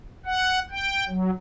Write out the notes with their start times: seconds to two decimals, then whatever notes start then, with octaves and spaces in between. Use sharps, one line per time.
0.25 F#5
0.71 G5
1.09 F#3